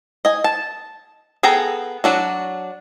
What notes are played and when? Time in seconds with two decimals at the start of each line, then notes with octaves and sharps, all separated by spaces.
0.25 D#5 G#5
0.44 A5
1.43 B3 G#4 A4 G5 A#5
2.04 F#3 D4 F#4